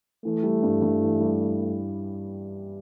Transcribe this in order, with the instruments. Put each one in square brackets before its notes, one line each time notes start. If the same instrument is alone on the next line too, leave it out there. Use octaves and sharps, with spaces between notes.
[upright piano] E3 [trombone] A3
[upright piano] G3
G2
G2
E3
G3